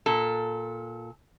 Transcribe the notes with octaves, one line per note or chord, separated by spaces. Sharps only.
A#2 A4